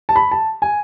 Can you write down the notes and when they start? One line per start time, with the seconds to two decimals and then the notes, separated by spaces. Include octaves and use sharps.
0.09 A5
0.16 B5
0.31 A5
0.62 G#5